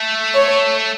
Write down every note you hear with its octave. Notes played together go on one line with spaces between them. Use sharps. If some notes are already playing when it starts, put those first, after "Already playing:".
Already playing: A3
C#5